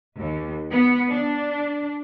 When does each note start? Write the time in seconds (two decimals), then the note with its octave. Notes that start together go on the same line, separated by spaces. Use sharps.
0.18 D#2
0.71 B3
1.09 D4